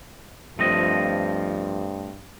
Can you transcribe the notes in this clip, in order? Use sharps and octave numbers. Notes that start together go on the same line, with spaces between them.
G2 F3 A3 C4 D#5